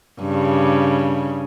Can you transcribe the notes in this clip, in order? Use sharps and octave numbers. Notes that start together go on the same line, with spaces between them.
G2 C#3